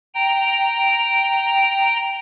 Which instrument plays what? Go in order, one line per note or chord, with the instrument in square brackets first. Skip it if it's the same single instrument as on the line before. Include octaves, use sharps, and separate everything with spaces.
[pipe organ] G5 A#5